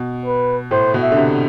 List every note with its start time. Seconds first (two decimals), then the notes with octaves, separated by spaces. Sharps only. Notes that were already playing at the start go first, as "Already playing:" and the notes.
Already playing: B2
0.25 B4
0.71 A2 C5
0.94 B2
1.01 E5
1.12 D3
1.17 C3